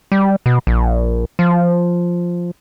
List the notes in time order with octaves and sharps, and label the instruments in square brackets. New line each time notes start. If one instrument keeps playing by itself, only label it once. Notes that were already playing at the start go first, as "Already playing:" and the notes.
[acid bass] G3
B2
A#1
F3